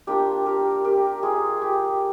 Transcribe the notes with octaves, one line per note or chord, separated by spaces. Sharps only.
A#3 D4 F4 G4
G4 A#4
G4 A#4
F4 G#4
G4